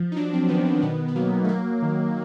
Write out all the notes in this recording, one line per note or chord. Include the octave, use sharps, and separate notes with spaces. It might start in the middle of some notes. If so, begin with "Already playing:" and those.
Already playing: F3
D#4
F#3 D4
C4
D#3 B3
C4
B2 B3
B3
F#3 A#3
A3
F#3 A#3
D#3